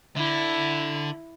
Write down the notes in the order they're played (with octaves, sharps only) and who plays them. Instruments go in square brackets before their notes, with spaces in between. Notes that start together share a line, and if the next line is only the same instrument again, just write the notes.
[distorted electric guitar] D3 [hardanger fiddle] E4